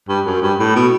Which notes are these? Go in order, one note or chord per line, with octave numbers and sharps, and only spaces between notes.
G2
F#2
G2
A2
B2